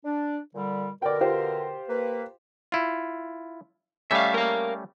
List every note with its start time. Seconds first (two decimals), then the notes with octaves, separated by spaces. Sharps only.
0.05 D4
0.55 A#2 D3 G3
1.02 B2 D3 A#4 D5 G5
1.21 F4 G4 C5
1.89 A#3 B4
2.72 E4 F4
4.11 G3 A3 C#4 E5 F5
4.34 A#4 F5